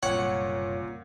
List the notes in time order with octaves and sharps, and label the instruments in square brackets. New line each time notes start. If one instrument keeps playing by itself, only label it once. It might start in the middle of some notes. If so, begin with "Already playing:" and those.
[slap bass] F#1 C2 F#2 [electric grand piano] A#2 [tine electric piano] C#5 [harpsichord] F#5